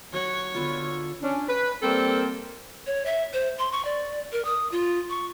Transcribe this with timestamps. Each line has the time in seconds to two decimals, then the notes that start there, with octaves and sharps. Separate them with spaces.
0.13 F#3 C#5 F#5
0.54 D3 B3 F4
1.22 C#4 D4
1.48 B4
1.83 G3 A#3 C4 A4 A#4 C5
2.87 C#5
3.06 E5
3.33 C5
3.59 C6
3.72 C#6
3.85 D5
4.32 A#4
4.45 D#6
4.72 F4
5.10 C#6